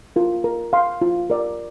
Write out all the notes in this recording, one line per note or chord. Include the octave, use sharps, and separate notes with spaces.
F4 A#4
A#4
F5 C6
F4
A#4 D5